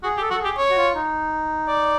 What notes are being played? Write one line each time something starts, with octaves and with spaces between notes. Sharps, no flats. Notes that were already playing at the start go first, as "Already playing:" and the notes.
F#4 G#4
G4
A4
F#4
A4
G4 G#4
C#5
F#4
F4
D#4
D5